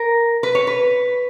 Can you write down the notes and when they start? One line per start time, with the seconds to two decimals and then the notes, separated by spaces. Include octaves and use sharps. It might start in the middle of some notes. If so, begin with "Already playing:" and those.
Already playing: A#4
0.43 B4
0.55 C#5
0.67 B4